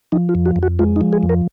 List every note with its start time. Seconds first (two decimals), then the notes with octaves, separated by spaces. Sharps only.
0.12 F3 D#4
0.29 F4
0.35 F2
0.46 F#4
0.56 F2
0.63 F#4
0.79 G#3 F4
0.96 D#4
1.01 F3
1.13 G#4
1.23 F2
1.29 A#4